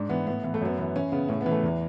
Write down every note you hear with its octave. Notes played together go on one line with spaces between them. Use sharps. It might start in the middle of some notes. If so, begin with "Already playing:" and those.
Already playing: G#2 D4
E3 B3
A2 B3
E3 B3
A3
F#2 B3
E3
E3 C#4
C#3 B3
A2 C#4
B3
E3
A3
E2